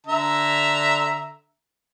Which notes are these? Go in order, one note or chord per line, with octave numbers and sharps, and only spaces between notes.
D3 E5 A#5